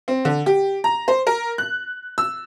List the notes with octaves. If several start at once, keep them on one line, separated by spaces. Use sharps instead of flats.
C4
D3
G4
A#5
C5
A#4
F#6
E6